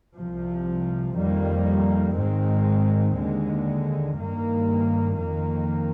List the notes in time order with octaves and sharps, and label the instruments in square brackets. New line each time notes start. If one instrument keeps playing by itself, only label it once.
[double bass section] C2 C3 F3
F2 D#3 G3 A#3
G#2 D#3 G#3 C4
D#2 D3 G#3
G2 D#3 A#3
F2 D#3 A#3